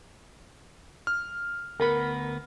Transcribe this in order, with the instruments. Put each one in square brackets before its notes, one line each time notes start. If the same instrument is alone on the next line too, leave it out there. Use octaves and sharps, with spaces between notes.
[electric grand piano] F6
[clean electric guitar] D2 B3 B5 [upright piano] A#4